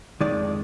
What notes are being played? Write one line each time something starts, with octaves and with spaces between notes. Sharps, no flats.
F2 D#3 G#3 D5